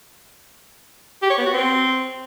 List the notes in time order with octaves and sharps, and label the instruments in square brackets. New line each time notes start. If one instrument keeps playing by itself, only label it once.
[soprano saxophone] G4
C#5
B3
F#4
C4